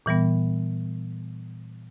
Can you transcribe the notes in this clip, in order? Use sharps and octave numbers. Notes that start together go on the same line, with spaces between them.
A#2 E3 G3 B3